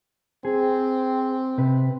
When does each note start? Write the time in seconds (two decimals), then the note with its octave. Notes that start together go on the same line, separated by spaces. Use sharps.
0.45 C4 G#4
1.58 C3 B4